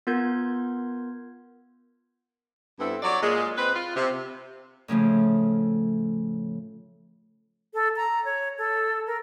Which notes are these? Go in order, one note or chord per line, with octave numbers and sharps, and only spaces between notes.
B3 F4 A#4 G6 G#6
G2 B3 C4 E4 A4
F#3 D5
A#2 G#3
C4 B4
F4
C3
A2 C#3 F3 A3
A4
A#5
C#5
A4
A#4